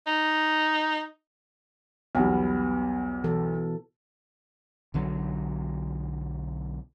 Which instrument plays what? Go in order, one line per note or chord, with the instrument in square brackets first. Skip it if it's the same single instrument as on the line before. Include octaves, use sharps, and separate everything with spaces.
[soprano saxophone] D#4
[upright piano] B1 E2 G3 [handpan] B3
[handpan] B2 E3 A4
[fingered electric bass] B1 D3 F#3